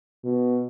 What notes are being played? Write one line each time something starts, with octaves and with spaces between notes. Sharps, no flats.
B2